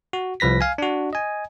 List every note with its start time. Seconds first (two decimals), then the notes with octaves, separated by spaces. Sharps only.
0.13 F#4
0.40 C2 F3 B4 A#6 B6
0.61 F5 G#5
0.78 D4 F#4
1.13 D#5 G#5